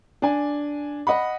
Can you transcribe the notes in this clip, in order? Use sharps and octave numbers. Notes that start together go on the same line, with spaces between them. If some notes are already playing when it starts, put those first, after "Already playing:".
D4 G#5
D#5 F#5 B5